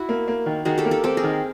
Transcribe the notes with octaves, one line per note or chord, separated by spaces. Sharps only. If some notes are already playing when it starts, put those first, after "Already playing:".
Already playing: E4 F#4
A#3
A#3
D#3
D#3 F#4 G#4
G4 A4
A#3
G4 A4
C4 G4 A4
G#4 A#4
D#3